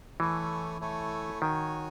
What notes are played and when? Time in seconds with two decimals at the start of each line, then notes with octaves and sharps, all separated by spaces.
0.20 E3 A3 E4 A4 C#5 G#5
0.80 A3 E4 A4 C#5 G#5
1.41 D#3 F#4 C#5 G#5